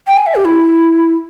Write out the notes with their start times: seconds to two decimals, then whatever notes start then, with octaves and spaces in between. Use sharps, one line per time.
0.07 G5
0.17 G#5
0.26 E5
0.35 G4
0.45 E4